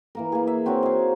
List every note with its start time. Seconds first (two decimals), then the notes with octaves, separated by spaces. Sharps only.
0.15 E3 A#3 A#4
0.32 A#3 G#4
0.47 E5
0.66 C4 F#4 A#4 C#5
0.83 D#4 G#4